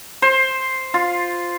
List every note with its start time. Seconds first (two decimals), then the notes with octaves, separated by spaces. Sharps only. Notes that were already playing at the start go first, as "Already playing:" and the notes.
0.22 C5
0.94 F4